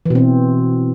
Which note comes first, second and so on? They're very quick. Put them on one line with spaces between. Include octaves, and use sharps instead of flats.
E3 B2 C4